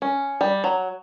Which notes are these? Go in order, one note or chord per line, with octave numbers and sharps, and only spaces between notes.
C#4
G3
F#3